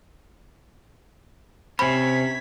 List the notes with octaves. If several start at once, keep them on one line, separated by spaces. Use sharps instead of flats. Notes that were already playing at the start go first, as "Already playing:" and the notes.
C3 C#4 C5 B5 G#6 B6